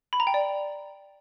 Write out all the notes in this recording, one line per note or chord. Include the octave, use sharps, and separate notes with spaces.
B5
A#5
G5
D5